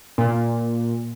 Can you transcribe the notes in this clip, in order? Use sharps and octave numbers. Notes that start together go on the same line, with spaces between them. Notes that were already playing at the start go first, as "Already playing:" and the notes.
A#2